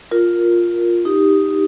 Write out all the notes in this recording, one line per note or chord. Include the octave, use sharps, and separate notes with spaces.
F4 A#4
D#4 G4